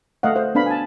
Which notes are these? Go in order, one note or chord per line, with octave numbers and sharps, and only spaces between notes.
A3 D#5 F5 F#5
C5
B3 D4 F5 B5
G#5 A5